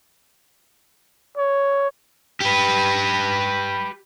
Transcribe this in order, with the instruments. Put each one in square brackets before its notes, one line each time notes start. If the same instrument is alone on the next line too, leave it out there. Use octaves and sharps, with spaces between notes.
[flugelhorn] C#5
[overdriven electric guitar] G4 B4